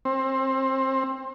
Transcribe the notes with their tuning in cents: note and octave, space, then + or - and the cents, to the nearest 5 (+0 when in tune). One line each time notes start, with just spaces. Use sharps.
C4 +25